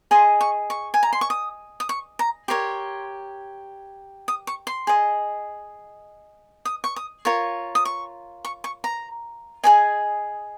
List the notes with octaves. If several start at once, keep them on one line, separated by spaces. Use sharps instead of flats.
G#4 D#5 C6
C#6
C#6
G#5
A#5
C6
C#6
D#6
D#6
C#6
A#5
G4 A#4 C#5 C6
D#6
C#6
C6
G#4 D#5
D#6
C#6
D#6
F4 A#4 C#5 C#6
D#6
C#6
C#6
C#6
A#5
G#4 C5 D#5 G#5